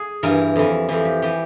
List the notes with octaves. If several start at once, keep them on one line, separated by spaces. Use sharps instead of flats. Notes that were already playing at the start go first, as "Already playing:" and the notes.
Already playing: G#4
G2 E3 A#4
F2 E3
F2 E3 G4
G4
E3 G4